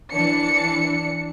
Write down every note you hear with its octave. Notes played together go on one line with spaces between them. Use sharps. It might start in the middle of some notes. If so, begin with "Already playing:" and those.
E3 D4 C#7